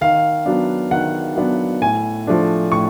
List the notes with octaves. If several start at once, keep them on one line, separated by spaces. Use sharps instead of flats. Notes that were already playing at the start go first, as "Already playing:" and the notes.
D#3 F5
F#3 B3 D4
D#3 F#5
F#3 B3 D4
A2 G#5
F3 A3 D4
A2 C#6